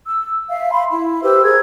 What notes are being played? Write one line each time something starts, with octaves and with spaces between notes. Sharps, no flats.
E6
E5 F5
B5 C6
E4
G4 B4 C5 E6
G#4 A#4 G#6